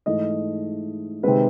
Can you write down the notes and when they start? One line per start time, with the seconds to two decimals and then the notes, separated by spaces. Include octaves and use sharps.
0.06 G#2 E3 A3 D#5
1.23 C3 D#3 G#3 C4 B4